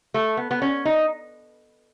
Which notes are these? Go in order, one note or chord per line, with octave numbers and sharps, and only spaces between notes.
A3
B3
B3
C#4
D#4